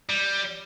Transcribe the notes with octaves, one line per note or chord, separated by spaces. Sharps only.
G3